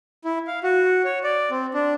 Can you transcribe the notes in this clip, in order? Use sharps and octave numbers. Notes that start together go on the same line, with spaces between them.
E4
F5
F#4
C#5
D5
C4
D4